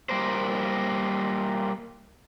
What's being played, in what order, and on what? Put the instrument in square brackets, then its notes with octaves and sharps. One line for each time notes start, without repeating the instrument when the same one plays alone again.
[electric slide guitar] G3 A#3 A#4 C5